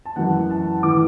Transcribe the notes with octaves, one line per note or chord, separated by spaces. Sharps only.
A5
F#2 E3 F#5
A5
A2 E3 D6